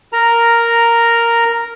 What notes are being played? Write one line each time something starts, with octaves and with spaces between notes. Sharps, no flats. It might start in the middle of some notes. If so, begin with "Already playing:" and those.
A#4 A#5